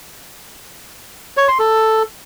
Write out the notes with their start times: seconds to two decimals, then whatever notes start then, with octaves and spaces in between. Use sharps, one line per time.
1.37 C#5
1.48 C6
1.59 A4